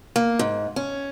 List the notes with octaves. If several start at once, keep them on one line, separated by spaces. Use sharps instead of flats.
A#3
G#2
C#4